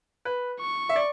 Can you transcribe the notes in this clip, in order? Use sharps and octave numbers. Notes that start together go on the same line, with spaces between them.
B4
C#6
E5
D5